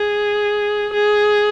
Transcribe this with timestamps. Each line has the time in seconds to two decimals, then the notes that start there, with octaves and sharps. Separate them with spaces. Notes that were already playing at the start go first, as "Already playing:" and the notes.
Already playing: G#4
0.93 G#4